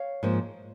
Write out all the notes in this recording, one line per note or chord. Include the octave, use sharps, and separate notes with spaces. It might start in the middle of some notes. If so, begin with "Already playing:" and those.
Already playing: C#5 F5
G#2 F3 A#3